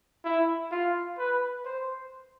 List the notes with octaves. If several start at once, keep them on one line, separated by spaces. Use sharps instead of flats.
E4
F4
B4
C5